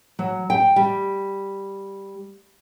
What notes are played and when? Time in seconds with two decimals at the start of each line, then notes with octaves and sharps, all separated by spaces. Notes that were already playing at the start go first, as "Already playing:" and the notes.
0.19 F#3
0.50 G5
0.76 G3